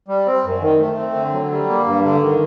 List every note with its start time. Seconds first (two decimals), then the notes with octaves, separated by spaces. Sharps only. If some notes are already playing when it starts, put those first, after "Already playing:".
0.08 G3
0.26 C4
0.44 F#2
0.61 D#3
0.79 A3
0.97 C4
1.15 D3
1.33 F#3
1.51 G3
1.69 A#3
1.87 G2
2.04 D3
2.22 D#3